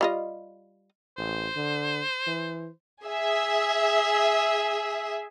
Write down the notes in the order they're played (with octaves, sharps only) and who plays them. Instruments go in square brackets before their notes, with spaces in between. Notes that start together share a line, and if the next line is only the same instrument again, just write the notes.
[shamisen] G3 F4 D#5
[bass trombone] A1 [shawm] C5
[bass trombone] D3
E3
[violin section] G#4 E5